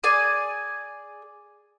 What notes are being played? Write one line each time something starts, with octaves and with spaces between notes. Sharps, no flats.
G#4 D5 G#5